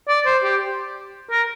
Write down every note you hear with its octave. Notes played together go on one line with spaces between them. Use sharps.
D5
C5
G4
A#4